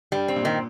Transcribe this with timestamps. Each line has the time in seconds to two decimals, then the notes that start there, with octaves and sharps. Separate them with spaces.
0.12 G2 G3
0.28 C4
0.36 A#2
0.45 D#3